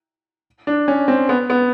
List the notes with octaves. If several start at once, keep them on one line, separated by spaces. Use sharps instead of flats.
D4
C#4
C4
B3
B3